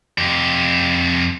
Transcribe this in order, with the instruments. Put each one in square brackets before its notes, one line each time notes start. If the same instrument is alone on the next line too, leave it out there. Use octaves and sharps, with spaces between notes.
[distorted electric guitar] F2 G4